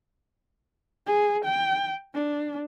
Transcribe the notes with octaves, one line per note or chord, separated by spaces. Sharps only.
G#4
G5
D4